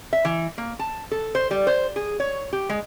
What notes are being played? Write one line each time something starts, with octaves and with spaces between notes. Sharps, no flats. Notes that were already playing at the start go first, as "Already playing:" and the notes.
E5
E3
A#3
A5
A4
C5
G3
C5
G#4
C#5
G4
G#3